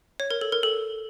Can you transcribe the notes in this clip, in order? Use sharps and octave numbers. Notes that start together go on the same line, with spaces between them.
C#5
A#4
A4
A#4
A4